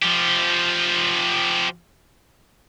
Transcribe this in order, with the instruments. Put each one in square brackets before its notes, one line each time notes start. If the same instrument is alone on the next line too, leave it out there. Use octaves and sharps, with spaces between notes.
[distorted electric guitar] F3 G4